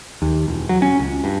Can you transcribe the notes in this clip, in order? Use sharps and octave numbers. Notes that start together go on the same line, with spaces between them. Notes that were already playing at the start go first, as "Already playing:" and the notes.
D#2
E1
F#3
C#4
C#2
G2